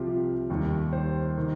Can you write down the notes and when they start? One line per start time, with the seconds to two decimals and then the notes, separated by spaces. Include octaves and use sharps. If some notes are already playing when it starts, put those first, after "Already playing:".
Already playing: C2 C3 F3 F4 G4
0.50 D#2 D#3 G3 D#4
0.93 C5
1.38 D#3